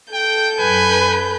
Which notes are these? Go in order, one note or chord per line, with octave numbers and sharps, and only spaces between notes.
A4 G5 G6
F#2 B4 G#5